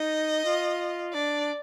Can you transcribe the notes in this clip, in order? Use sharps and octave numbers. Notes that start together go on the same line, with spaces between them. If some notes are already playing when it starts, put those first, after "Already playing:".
Already playing: D#4 D#5
F4
D4 D5